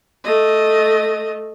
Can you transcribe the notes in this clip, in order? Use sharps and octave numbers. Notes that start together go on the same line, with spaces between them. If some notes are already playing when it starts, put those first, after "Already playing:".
A3 D#5